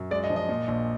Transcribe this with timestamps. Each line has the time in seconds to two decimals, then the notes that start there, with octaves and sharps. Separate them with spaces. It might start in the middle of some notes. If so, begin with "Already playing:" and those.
Already playing: F#2
0.11 G#3 D5
0.24 D#5
0.30 F3
0.36 D#5
0.49 A#2
0.68 A#1